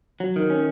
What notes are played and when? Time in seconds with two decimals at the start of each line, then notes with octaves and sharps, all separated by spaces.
0.20 F#3
0.36 D#3
0.50 C#4